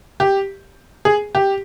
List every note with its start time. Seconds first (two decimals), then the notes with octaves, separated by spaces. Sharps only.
0.20 G4
1.05 G#4
1.35 G4